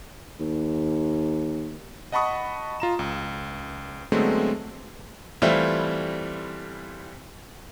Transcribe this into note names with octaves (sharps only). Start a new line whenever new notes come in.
D#2
D#5 F#5 A5 B5 C#6 D#6
F4 A#5 E7
C#2
D3 F#3 G#3 A3 B3 C4
E3 G3 A3 C4 E4 F4